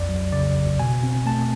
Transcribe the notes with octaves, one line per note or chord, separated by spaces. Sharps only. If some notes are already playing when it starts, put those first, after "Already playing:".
Already playing: B1 F2 D5
F#3
C#3 D5
G1
B2 G#5
C4
A3 A5